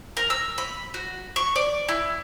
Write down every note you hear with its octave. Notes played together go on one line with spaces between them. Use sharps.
A#4
E6
B5
F#4
C#6
D5
E4